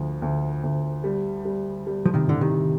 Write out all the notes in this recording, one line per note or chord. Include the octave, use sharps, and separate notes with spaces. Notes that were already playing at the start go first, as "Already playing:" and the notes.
Already playing: D2 F3
D2
D2
G3
G3
G3
F3
C3 D#3
A2 D3
C3 D#3